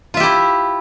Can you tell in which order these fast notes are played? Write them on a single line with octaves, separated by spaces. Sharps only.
F4 E5 G4 E4